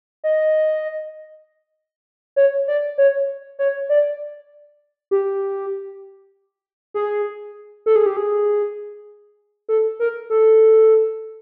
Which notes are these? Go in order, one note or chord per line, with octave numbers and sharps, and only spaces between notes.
D#5
C#5
D5
C#5
C#5
D5
G4
G#4
A4
G#4
G4
G#4
A4
A#4
A4